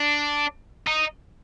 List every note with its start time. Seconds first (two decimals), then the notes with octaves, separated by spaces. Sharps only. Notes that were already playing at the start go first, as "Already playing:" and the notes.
Already playing: D4
0.87 D#4